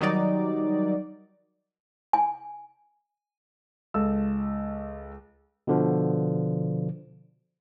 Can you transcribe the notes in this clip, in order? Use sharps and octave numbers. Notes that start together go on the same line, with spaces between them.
D#3 F#3 G3 D#4 D5
G#5
C#2 A4 E6
B2 D3 F3